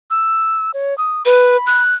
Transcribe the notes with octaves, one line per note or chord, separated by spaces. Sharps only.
E6
C#5
D#6
B4 B5
F#6